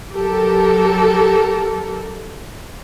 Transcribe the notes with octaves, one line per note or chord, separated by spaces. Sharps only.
F#3 G4 A4 A#4